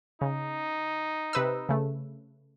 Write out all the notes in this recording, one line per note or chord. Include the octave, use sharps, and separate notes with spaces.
C#3 D#4
C3 B4 E6
C#3 A3